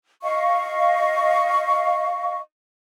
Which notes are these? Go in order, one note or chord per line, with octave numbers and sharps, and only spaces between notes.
D#5 F5 C#6